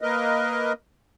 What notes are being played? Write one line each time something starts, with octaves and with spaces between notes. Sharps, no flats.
A#3 A#4 B4 D#5